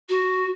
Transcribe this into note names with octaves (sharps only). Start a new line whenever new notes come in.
F#4